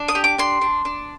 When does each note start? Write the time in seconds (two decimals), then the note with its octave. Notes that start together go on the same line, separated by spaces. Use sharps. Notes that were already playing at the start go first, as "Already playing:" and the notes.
Already playing: D4
0.08 D#6
0.15 G4
0.24 D6
0.38 D4 C6
0.61 D4
0.85 D4